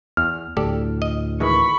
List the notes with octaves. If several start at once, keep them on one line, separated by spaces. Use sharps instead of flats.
E2 F6
D2 A2 G4 A4 D5
D#5
D#3 E3 G#3 B5 C#6